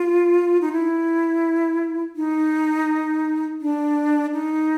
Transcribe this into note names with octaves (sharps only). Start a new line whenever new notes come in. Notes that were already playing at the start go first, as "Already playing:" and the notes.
Already playing: F4
D#4
E4
D#4
D4
D#4